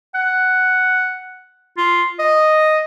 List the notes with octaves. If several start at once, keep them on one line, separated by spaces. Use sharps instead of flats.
F#5
F4
D#5